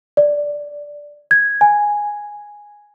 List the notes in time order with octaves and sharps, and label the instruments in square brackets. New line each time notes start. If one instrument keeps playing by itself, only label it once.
[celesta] D5
G#6
G#5